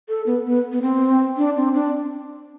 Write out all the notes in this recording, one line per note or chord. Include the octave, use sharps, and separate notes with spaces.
A4
B3
B3
B3
C4
D4
C4
D4